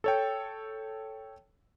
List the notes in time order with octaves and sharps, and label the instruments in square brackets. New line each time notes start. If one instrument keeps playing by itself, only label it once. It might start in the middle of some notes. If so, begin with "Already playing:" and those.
[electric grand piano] A4 C#5 G5